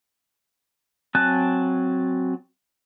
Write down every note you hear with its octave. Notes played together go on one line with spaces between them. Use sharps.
F#3 C4 G#5 A5 F#6